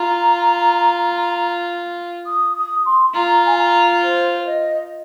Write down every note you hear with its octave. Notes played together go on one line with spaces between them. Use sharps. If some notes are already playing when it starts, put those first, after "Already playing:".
Already playing: F4 A#5
D#6
D#6
C6
F4 A#5
G#5
A#5
C5
C5
D#5